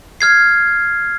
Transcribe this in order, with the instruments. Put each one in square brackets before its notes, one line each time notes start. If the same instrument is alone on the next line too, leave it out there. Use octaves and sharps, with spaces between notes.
[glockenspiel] F6 G#6 C7